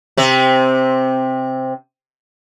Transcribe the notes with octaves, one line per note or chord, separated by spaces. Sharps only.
C3 C4